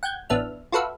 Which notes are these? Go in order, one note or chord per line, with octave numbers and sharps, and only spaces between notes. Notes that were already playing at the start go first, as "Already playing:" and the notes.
F#5 G5 G6 G#6
A1 B3 D4 E5 F6
F4 F#4 A4 B4 E5 F5